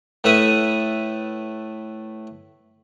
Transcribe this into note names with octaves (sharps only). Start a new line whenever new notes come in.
A2 A3 A4 B4 E5 D#6